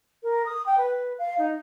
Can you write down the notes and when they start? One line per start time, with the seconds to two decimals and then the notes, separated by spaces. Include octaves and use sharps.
0.23 A#4
0.46 D#6
0.66 G5
0.77 B4
1.18 F5
1.38 D#4